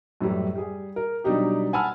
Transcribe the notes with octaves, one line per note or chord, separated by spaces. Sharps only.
F#2 A2 E3 G3
G3 G#4
A#4
B2 F#3 G3 D4 D#4 G4
F#5 G#5 A5 B5 E6 F6